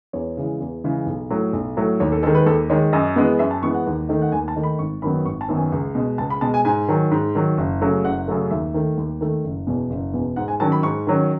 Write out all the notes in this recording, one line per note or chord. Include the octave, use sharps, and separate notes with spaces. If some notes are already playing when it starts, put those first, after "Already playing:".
E2 C#5
C#3 E3 G#3
E2
C#3 E3 G#3
B1
A2 F#3 A3
B1
A2 F#3 A3
D#2 C#5
A4
D#3 G#3 A4
B4
D#2 A4
D#3 G#3 C#5
F#2 D#5
E3 G#3 B3
F#2 E5
A5
E3 G#3 B3 C#6
F#5
D#2
D#3 A3 D#4
F#5
D#2 G#5
A5
D#3 A3 D#4
B5
G#1 C#6
F#2 D#3 F#3 B3 B5
G#1 C#6
A5
F#2 D#3 F#3 B3
G#5
C#2
B2 G#3
C#2 A5
B5
B2 G#3 A5
G#5
G#2 G#5
D#3 F#3
G#2
D#3 F#3
F#1
F#2 C#3 F#3 A3
F#1 F#5
F#2 C#3 F#3 A3
D#2 E5
D#3 A3
D#2
D#3 A3
F#1
E2 B2
F#1
E2 B2
G#2 F#5
G#5
D#3 F#3 C#4 A5
B5
G#2 C#6
D#3 F#3 C#4